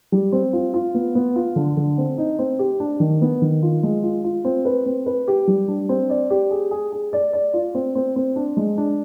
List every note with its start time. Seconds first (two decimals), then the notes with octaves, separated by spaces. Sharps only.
0.12 G3
0.32 C4
0.53 F4
0.74 F4
0.94 B3
1.15 B3
1.36 F4
1.56 D3
1.77 D3
1.98 C4
2.18 D#4
2.39 C4
2.59 G4
2.80 D4
3.00 D#3
3.21 B3
3.42 D#3
3.63 F4
3.83 G#3
4.03 F4
4.24 F4
4.45 C4
4.65 B4
4.86 C4
5.06 B4
5.28 G4
5.48 G3
5.68 D4
5.89 C4
6.10 D5
6.30 G4
6.51 G#4
6.71 G#4
6.92 G#4
7.13 D5
7.33 D5
7.54 F4
7.75 C4
7.95 C4
8.16 C4
8.36 D4
8.57 G#3
8.78 D4